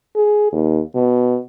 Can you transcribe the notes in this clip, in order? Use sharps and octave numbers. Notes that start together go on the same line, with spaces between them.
G#4
D#2
B2